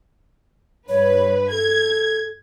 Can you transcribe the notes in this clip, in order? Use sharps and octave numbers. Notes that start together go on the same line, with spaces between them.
G2 B4 C#5
A4 G#6